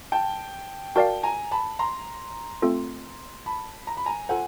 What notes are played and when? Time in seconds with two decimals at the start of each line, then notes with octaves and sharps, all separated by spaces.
0.12 G5 A5
0.95 F#4 A#4 D5 F5 G5 A5
1.23 G#5 A#5
1.51 A5 B5
1.79 A#5 C6
2.62 A3 C4 F4 A4
3.46 A5 B5
3.87 A#5
3.97 B5
4.06 G#5 A#5
4.29 F4 A4 C5 F#5 G#5